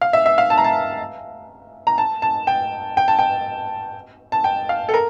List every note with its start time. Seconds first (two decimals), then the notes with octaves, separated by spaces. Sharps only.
0.01 F5
0.13 E5
0.26 E5
0.38 F5
0.50 A5
0.58 A#5
0.64 A5
1.87 A#5
1.98 A5
2.22 A5
2.47 G5
2.97 G5
3.08 A5
3.19 G5
4.32 A5
4.44 G5
4.69 F5
4.89 A4
4.94 A#4